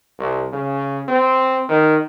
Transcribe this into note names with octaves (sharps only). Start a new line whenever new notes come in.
C2
C#3
C4
D#3